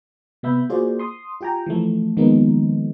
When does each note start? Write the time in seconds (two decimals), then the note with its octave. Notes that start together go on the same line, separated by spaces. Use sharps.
0.43 C3 B3 E5 B5 G6
0.70 A#3 F4 F#4 G#4 C5 D5
0.99 C6 D#6
1.41 F4 G4 G5 G#5 A#5
1.66 E3 F3 A3
2.17 D#3 F3 G#3 A#3 B3 D#4